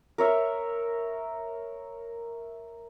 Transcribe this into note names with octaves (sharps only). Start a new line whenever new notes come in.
A#4 C#5 E5